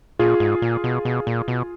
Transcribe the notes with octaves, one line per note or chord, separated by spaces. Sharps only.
A#2 F4 G#4
G#2
A#2
B2
B2
A#2
B2